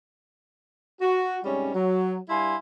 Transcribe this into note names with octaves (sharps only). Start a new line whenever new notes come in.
F#4
G#2 C3 G3 C#4
F#3
G2 G3 E4 F5 G#5 C6